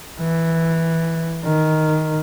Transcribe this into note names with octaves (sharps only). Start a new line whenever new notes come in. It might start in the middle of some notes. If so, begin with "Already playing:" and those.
E3
D#3